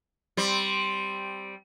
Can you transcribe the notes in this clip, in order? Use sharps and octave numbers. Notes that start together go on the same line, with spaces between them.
G3 C4